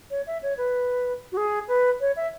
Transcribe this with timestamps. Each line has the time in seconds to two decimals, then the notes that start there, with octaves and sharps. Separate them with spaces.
0.11 C#5
0.27 E5
0.43 C#5
0.58 B4
1.32 F#4
1.37 G#4
1.68 B4
2.01 C#5
2.16 E5